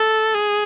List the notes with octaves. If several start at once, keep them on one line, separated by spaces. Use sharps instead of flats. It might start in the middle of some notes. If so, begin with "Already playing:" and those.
Already playing: A4
G#4